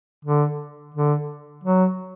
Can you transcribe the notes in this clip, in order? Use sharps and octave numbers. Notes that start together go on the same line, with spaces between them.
D3
D3
F#3